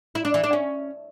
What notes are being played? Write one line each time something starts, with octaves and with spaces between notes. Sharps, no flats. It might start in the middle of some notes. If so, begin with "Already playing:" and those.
E4
D4
E3
D4
C#4